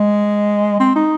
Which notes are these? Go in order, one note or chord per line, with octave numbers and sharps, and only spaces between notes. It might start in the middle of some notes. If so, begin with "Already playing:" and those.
Already playing: G#3
C4
D#4